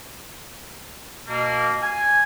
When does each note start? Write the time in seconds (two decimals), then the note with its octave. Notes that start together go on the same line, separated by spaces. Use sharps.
1.28 B2 A#3
1.82 G#5